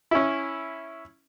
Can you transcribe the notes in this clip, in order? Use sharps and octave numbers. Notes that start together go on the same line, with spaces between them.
C#4 E4